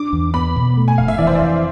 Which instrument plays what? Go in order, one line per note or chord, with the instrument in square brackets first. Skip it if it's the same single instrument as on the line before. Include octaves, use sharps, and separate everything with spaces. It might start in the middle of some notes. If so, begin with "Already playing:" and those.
Already playing: [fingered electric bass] D4 [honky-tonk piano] D6
[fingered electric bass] E2
[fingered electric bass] B3 [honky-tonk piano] B5
[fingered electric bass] B2
A3
[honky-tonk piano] G#5
[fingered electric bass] F1 [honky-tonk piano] F5
[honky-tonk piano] E5
[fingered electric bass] E3 [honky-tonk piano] D5
[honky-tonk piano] C5
D5
[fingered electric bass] F2